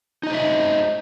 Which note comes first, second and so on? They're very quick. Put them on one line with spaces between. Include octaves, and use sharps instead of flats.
D#4 D#5 C5 E5